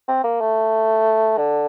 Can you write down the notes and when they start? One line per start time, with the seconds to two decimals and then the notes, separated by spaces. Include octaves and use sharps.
0.08 C4
0.24 A#3
0.41 A3
1.38 D3